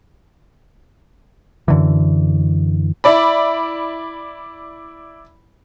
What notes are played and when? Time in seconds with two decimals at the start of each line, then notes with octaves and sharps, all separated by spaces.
1.68 F#2 D3 E3
3.04 E4 D5 B5